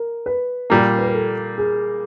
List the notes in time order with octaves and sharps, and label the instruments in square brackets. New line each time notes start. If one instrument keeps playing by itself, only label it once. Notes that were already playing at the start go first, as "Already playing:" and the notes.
Already playing: [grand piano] A#4
B4
[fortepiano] A#2 G3 A#3 [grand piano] A#4
[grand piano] B4
A#4
A4
G#4